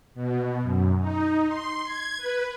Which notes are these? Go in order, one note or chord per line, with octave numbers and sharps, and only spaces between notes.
B2
F#2
D#4
C6
G#6
B4